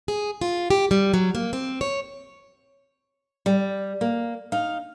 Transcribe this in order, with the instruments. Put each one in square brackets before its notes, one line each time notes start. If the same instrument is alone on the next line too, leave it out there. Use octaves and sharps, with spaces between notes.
[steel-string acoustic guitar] G#4
F4
G4
G3
F#3
A#3
C4
C#5
G3
A#3
D#4 F5